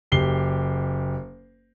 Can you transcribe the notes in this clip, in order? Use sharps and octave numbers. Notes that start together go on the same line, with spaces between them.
F#1 G4 C7 G7